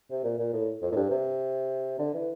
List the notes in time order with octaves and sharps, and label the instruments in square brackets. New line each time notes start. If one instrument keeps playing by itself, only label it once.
[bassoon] C3
A#2
A#2
A2
F2
A2
G2
C3
D3
E3